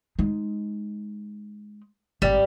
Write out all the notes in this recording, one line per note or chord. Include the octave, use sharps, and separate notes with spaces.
G#3 D#4
G#1 G#2 G3